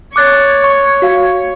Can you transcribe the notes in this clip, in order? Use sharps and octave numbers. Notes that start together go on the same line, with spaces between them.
C#5 D6 F#6 A6
C#6
F#4 F5